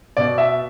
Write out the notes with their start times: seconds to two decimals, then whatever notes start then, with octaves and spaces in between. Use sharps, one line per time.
0.17 B2 D5
0.38 E5